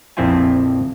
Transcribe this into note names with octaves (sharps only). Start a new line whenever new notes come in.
A#1 F2 C4 E4 F4 G#5